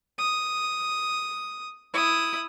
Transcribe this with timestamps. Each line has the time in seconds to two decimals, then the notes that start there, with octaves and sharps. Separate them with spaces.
0.18 D#6
1.93 E4 D#6